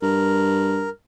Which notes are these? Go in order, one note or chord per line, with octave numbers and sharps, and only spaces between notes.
G2 A#4